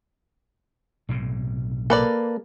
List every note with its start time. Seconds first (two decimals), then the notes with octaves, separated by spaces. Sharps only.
1.09 B1 A2 C3
1.90 A#3 A4 B4 D5